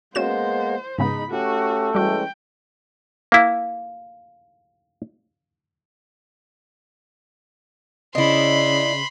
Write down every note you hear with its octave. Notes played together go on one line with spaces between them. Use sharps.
G#3 A#3 B3 C#4 F#4 C5 E7
G#2 C#3 G#3 B3 D#4 B5
A3 C#4 F#4 G4
E3 G3 G#3 C#4 F#4 G5
A#3 E4 F5
C#3 D4 E4 D#5 B5 C6